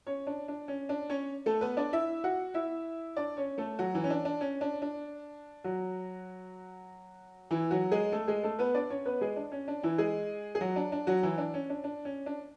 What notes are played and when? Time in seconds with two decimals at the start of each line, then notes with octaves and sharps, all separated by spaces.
0.07 C#4 C#5
0.27 D4
0.48 D4
0.68 C#4
0.89 D4
1.10 C#4 C#5
1.46 A3 A4
1.61 B3 B4
1.77 D4 D5
1.93 E4 E5
2.24 F#4 F#5
2.54 E4 E5
3.17 D4 D5
3.37 C#4 C#5
3.58 A3 A4
3.79 F#3 F#4
3.94 E3 E4
4.04 C#4
4.10 D4
4.25 D4
4.41 C#4
4.61 D4
4.82 D4
5.64 F#3 F#4
7.51 E3 E4
7.71 F#3 F#4
7.91 G#3 G#4
8.12 A3 A4
8.28 G#3 G#4
8.43 A3 A4
8.59 B3 B4
8.75 D4 D5
8.90 C#4 C#5
9.05 B3 B4
9.21 G#3 G#4
9.36 D4
9.52 C#4
9.68 D4
9.83 E3 E4
9.98 G#3 G#4
10.55 G#4
10.61 F#3 F#4
10.76 D4
10.92 D4
11.07 F#3 F#4
11.23 E3 E4
11.38 D4
11.54 C#4
11.70 D4
11.84 D4
12.05 C#4
12.26 D4